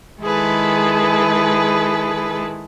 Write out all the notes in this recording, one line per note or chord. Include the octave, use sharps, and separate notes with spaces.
D#3 G#3 E4 G#4 A4 B4